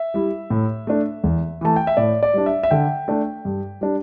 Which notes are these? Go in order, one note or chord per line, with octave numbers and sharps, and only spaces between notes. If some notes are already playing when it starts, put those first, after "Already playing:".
Already playing: E5
G3 E4
A2
A3 D4
E2
E3 A3 A5
G5
E5
A2 D5
D5
G3 D4
E5
E5
D3 G5
A3 D4
G2
G3 D4